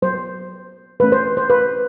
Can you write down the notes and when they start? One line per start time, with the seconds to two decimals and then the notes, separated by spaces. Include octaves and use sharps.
0.02 F#3 B3 C5
1.00 E3 A3 C#4 B4
1.12 C5
1.37 C5
1.50 B4